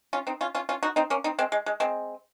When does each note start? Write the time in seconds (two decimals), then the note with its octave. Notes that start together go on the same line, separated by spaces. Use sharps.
0.13 C#4 F4
0.27 C4 D#4
0.41 C#4 F4
0.55 C#4 F4
0.69 C#4 F4
0.83 D#4 F#4
0.96 C4 D#4
1.10 A#3 C#4
1.24 C4 D#4
1.39 G#3 C4
1.52 G#3
1.66 G#3
1.80 G#3 C4